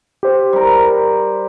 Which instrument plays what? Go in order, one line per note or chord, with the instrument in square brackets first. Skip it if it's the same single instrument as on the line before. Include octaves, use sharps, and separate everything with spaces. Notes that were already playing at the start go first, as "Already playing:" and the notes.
[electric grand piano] G4 C5
[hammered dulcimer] G3 A#4